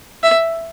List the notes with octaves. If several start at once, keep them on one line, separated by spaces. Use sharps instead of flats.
E5